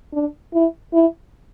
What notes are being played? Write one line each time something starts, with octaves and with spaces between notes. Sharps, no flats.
D4
E4
E4